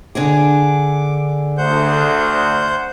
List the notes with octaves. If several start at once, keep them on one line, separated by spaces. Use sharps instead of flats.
D3 D4 G#4 D6
D2 C5 F#5 G6